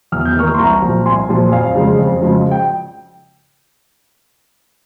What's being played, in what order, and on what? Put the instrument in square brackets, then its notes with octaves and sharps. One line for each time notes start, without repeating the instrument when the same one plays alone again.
[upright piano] E2 F6
G6
E3 A#3 C#6 F6
C6
C2 A#5 C#6
A#2 F3
C2 G#5 C6
A#2 F3
F2 F5 G#5
C#3 F3 G#3
F2
C#3 F3 G#3
G5